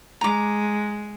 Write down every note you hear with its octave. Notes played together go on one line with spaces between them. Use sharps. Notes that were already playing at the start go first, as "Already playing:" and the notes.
G#3 A#5 D6